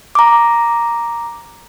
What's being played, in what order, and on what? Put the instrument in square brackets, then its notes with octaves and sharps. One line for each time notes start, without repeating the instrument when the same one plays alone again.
[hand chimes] A#5 D6